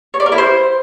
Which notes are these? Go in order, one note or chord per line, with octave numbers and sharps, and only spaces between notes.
C#5
D5
A#4
E4
C5